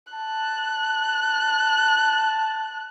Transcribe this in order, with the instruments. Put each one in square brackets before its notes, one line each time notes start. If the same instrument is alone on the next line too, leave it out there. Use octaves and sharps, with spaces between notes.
[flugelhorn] A5 [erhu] F#6